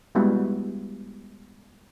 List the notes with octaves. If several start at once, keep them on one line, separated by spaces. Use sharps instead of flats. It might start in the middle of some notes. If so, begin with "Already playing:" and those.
G3 G#3 B3 E4 F#4